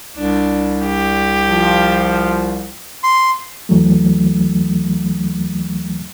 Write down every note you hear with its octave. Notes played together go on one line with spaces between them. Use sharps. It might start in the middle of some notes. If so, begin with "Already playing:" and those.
C2 D4
G4
F3
C6
D#2 E3 F#3 A3